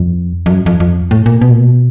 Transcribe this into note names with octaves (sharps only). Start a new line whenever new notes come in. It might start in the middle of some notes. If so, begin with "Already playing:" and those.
Already playing: F2
F2
F#2
F2
F2
A2
A#2
B2
A#2
B2